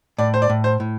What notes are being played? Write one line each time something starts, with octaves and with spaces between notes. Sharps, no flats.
A2 D5
C5
D5
A2
C5
A2